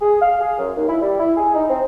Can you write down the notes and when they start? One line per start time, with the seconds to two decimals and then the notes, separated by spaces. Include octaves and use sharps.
0.01 G#4
0.22 F5
0.41 G#4
0.58 F#2
0.77 D#2
0.88 E4
1.02 G3
1.20 E4
1.36 G#4
1.55 D#4
1.69 C4